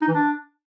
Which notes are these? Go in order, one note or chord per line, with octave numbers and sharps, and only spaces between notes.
D#4
E3
D4